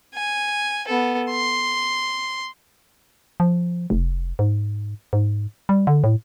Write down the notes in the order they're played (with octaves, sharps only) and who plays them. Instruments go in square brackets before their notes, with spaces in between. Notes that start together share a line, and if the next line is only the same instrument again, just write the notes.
[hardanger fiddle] G#5
B3 A4
C6
[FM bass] F3
F1
G#2
G#2
G3
D3
A2